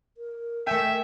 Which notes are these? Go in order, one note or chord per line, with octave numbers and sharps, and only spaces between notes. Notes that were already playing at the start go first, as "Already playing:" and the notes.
A#4
A3 E5 G5 G#5